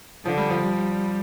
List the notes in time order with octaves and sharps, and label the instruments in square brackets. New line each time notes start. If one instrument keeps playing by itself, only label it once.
[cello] D3 [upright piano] F3
[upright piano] G3
F3
[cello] G3